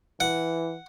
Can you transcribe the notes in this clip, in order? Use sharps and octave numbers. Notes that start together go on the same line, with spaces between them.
E3 F#5